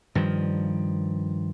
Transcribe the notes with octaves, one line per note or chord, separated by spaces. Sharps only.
G2 D#3 F3